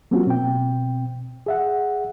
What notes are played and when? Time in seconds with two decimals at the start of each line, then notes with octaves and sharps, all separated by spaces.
0.11 F#3 A#3 C4 C#4 F4 F#4
0.27 B2 C4 G5
1.46 G#4 E5 F#5